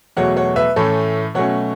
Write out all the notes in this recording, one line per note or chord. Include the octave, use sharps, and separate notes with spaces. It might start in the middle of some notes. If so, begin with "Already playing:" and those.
E2 B2 F#3 A3 C#5 F#5
C#5 F#5
B4 E5
A2 E3 A3 C#4 A4 C#5
B2 F#3 A3 C#4 C#5 F#5